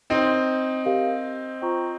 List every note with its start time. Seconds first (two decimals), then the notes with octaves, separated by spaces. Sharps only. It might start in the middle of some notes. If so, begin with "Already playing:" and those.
0.10 C4 D#4 G4 A#4 C#5 G5 C6
0.85 G4 A#4 F5
1.62 F4 C5 G5 A#5 C#6